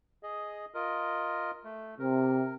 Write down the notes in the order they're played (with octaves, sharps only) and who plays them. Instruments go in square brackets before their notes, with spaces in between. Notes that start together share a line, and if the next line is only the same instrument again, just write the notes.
[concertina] G#4 D#5
F4 A#4 D#5
A3
[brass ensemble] C3 [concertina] A#4